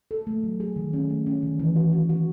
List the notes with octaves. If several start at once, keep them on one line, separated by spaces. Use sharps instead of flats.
A4
A3
F#3
G#4
D#3
C#4
A3
C#4
D#3
E3
F#4
F#4
F#4